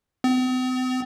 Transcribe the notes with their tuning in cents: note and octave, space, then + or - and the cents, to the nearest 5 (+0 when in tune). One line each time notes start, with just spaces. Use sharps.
C4 -45